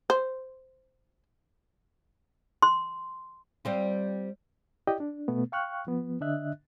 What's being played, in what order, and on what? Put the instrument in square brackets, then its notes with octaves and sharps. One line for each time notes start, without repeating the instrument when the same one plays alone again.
[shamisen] C5
[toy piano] C6
[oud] G3 C4 F4
[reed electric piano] E4 G4 D5 D#5 G5
D4
B2 A3 B3
F5 G5 C#6 F6 F#6
F3 B3
D3 D4 D#5 E5 F#6